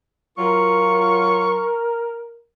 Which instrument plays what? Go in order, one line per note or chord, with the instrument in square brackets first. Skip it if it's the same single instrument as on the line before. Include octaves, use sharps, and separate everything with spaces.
[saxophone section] F#3 F4 [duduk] A#4 [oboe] C#6